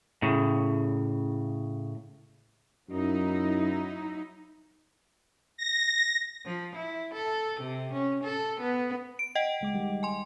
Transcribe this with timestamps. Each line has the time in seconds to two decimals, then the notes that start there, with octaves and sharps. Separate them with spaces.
0.22 A2 C#3
2.90 F#2 F#3 D#4 E4
5.57 A#6
6.46 F3
6.76 E4
7.14 A4
7.60 C3
7.93 C#4
8.24 A4
8.61 B3
9.19 D7
9.35 D#5 F#5 G5
9.61 C#2 G#3 D6
9.74 D#3 G3
10.03 G#5 C6